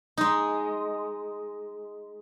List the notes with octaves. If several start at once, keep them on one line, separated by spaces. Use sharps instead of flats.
G#3 D#4